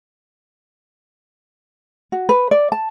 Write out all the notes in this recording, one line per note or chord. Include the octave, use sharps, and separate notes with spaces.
F#4
B4
D5
A5